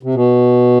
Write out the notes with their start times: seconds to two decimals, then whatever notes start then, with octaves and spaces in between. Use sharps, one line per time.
0.03 C3
0.15 B2